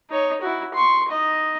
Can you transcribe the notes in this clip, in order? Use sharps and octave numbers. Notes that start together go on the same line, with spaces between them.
D#4 C#5
E4 F#4
C6 C#6
D#4 D#5